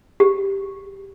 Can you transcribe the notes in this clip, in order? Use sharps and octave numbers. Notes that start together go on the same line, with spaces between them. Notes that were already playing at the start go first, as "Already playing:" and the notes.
G4